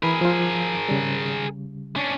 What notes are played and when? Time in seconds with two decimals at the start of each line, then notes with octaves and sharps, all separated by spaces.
0.03 E3 G#4 A#4 B5
0.21 F3 F4
0.89 C#3 G3
1.96 C#4 D4